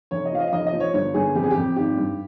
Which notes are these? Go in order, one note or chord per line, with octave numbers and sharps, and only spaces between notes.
F1 C#5
D#5
F3 F5
D#5
F5
F1 D#5
D#5
F3
C#5
G1 C#5
G1 G#4
F2 G4
G#4
G4
F2
G#1 G4
G2